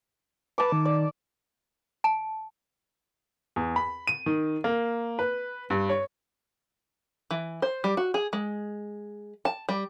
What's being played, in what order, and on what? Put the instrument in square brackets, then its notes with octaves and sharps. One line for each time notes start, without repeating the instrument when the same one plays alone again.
[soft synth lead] B4 [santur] A5 D6
[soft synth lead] D#3
[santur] D5
[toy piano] A5
[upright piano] E2
B5
D#7
D#3
A#3
B4
G2
C#5
[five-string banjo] E3
C5
G3
F#4
G#4
G#3
A5
G3